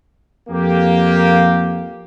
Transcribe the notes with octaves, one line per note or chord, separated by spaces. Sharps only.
F2 A#3 G4